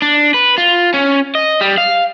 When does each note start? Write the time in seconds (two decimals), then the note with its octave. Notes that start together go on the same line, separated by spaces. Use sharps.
0.02 D4
0.34 B4
0.58 F4
0.94 C#4
1.35 D#5
1.61 G3
1.78 F5